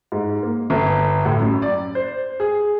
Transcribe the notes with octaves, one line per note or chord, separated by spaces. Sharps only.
G#2
A#3
G1
A2
F#2
D5
C5
G#4